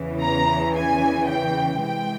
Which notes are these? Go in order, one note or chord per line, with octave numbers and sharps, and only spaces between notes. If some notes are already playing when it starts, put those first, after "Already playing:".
Already playing: E2 C#3 E3
A#5
G#5
G5
C3 E3 G#3 C4 G5